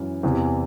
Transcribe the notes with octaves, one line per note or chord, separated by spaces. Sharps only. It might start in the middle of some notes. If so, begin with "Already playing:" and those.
Already playing: F#2 E3
E2 C3 E3